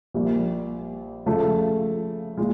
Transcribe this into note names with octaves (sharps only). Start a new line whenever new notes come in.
A#1 A#2 G3 A#3
C#3 F3 A3
A#2 G#3